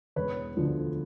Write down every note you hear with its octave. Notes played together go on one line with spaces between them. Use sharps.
E1 B4 C#5
D2 D3 F3